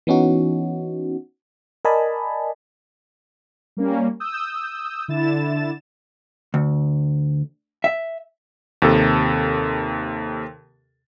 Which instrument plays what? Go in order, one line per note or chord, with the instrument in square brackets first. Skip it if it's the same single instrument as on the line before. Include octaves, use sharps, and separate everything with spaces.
[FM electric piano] E3 B3 C#4 D#4 F#4
A#4 D5 D#5 G#5 A5 B5
[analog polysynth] G3 A#3 C#4
D#6 E6 G6
D3 E4 A6 E7
[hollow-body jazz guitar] D2
E5
[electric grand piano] D#2 C3 A4